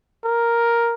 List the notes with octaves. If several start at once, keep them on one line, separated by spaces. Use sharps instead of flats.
A#4